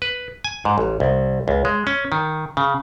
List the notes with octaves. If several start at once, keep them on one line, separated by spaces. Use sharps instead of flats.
B4
G#5
G#2
A1
C2
C#2
G#3
C#4
D#3
C#3